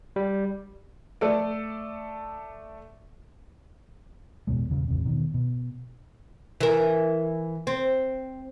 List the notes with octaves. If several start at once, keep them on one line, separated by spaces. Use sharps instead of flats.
G3
A3 A4 D5
A1 E2 B2 G#3
E2 A#2 C#3
A1 E2 C3
B2 D#3
B2
E3 A#4
C4